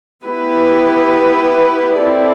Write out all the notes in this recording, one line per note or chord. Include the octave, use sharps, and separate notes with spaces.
B3 E4 G4 B4
C4 E4 A4 D5